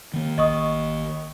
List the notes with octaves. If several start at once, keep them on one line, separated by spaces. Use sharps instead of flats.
D#3 A#3
A1 D#5 C#6 D#6